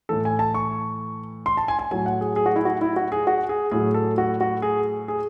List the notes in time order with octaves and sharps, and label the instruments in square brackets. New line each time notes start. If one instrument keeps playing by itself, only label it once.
[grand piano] A2 E3 A4
G#5
A5
C#6
C6
A5
G#5
G#5
A2 F#3 G#5
F#5
G#4
G#4
F#4
E4
F#4
E4
F#4
G#4
F#4
G#4
A2 F#3 G#4
A4
F#4
F#4
G#4
G#4